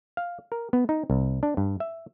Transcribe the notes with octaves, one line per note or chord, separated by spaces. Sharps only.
F5
A#4
B3
D#4
C2
D4
G2
E5